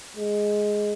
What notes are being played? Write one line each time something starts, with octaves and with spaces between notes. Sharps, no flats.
G#3